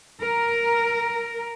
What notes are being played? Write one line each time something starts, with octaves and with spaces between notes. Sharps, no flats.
A#4